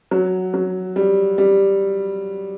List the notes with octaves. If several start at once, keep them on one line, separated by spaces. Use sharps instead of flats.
F#3
F#3
G3
G3